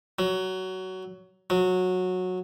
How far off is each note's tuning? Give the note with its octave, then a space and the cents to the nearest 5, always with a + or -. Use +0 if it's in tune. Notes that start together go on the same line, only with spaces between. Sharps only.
F#3 +15
F#3 -15